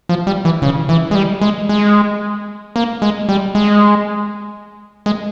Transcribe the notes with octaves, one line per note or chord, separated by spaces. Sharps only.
F3
G3
E3
C#3
E3
G#3
G3
G#3
G#3
A#3
G#3
G3
G#3
G#3